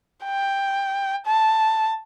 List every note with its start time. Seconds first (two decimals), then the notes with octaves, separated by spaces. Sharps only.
0.25 G5
1.26 A5